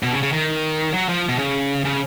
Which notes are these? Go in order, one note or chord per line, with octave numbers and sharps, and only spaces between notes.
B2
C#3
C#3
D#3
F#3
F3
B2
C#3
C#3